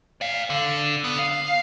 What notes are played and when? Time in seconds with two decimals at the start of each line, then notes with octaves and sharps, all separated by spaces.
0.21 D5 F5
0.50 D3
1.04 B3
1.19 F5